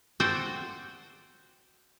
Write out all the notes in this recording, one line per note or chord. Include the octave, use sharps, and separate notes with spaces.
F#4 A4 C5 D5 F#5 G5